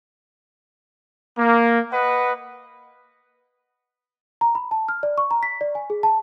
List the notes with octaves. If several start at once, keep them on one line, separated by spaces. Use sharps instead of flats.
A#3
B4 D#5 F#5
A#5
B5
A5
F6
D5
C#6
A#5
B6
D5
G#5
G#4
A5